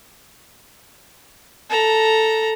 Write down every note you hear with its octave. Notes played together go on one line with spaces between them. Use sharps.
A4 A#5